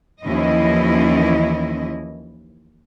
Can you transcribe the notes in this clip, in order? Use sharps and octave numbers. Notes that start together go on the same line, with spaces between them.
D#2 E3 F3 C#4 E4 D#5